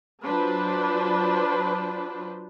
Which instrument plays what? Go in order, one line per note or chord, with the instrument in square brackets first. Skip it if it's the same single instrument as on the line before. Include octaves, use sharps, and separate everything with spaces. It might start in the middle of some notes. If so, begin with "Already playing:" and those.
[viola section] F#3 D4 F4 B4 C5 A5